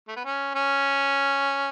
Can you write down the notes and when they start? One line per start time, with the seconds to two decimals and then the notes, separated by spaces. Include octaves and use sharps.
0.08 A3
0.16 B3
0.25 C#4
0.55 C#4